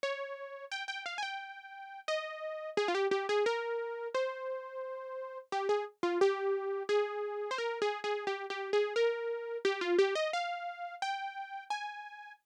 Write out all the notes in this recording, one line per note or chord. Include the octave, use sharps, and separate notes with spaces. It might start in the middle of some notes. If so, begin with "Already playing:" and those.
C#5
G5
G5
F5
G#5
G5
D#5
G#4
F4
G4
G4
G#4
A#4
C5
G4
G#4
F4
G4
G#4
C5
A#4
G#4
G#4
G4
G4
G#4
A#4
G4
F4
G4
D#5
F5
G5
G#5